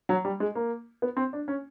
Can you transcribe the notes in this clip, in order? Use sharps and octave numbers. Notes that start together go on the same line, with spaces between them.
F#3
G3
G#3
A#3
B3
C4
D4
C#4